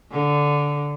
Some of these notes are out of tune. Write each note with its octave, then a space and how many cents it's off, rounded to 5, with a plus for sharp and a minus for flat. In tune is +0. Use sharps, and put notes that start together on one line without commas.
D3 -10